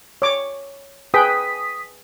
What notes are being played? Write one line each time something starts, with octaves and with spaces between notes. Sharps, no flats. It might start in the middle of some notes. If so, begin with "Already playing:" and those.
C#5 D6
G#4 B4 G5 D#6 B6